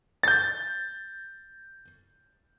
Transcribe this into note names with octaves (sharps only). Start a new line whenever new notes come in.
G6 A6